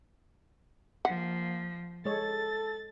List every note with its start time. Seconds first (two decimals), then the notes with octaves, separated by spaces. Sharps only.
1.05 F3 A#3 F#5
2.05 G#3 A4 C#5 D#5 A6